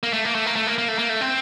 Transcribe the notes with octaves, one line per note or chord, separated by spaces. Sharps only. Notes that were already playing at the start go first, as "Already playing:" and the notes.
A#3
A3
A#3
A3
A#3
A3
A#3
A#3
A3
A#3
A3
C4